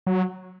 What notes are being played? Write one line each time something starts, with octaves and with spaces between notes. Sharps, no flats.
F#3